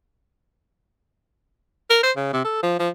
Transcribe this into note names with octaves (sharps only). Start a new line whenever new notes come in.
A#4
C5
C#3
C3
A4
F3
F3